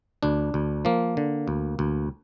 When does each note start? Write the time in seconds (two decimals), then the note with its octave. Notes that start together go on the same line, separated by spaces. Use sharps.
0.23 D2 D4
0.54 D2
0.85 F3 A#3
1.17 D3
1.48 D2
1.79 D2